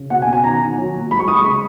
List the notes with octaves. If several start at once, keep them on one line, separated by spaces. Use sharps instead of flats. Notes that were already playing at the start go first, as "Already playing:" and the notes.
Already playing: C#3
B2 F#5
G#5
B2
G#5
D#3 A#5
D#3
F#3
A#2
G#3 B5
C#6
G#3 D#6
C#6
C#3 B5